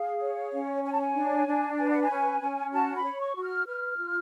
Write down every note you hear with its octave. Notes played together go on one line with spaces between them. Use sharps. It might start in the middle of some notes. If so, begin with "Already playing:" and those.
Already playing: G#4 F5
C#5
C#4
C#5 G#5
A5
G#5
D4
D4
B4 G#5
F#5
G#5
C#4
C#4
F#4 A5
B5
C#5
C#6
F#4
F6
B4 F6
F4